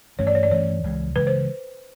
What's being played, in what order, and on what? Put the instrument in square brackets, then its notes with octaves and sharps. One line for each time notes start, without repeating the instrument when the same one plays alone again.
[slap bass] G2 E3 A3 C#4 [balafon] C#5
[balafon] D5
C#5
D5
[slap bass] G2 E3 A3 C#4 [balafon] C#5
[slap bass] C#2 C#3 E3 G#3
[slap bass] C#2 C#3 E3 G#3 [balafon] B4
[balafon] C5